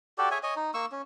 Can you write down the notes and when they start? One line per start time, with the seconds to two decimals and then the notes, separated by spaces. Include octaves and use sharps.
0.18 F#4 G4 A4 D5
0.31 G#4 C#5 E5 G#5
0.43 C#5 D#5 G#5
0.56 D#4
0.74 A#3 C#6 E6
0.92 C#4